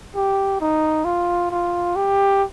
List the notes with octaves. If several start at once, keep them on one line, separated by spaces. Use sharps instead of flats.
G4
D#4
F4
F4
G4